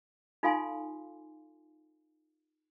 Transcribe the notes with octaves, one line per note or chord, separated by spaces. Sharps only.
D#4 F4 A4 F5 G#5 C6